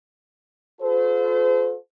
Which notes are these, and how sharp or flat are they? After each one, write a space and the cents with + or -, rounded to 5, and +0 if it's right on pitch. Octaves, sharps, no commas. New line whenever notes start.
F4 +35 A4 -25 C5 -35